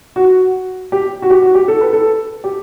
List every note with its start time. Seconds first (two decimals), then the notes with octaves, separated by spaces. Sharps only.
0.16 F#4
0.92 G4
1.22 F#4
1.30 G4
1.42 F#4
1.55 G4
1.68 A4
1.81 B4
1.93 A4
2.44 G4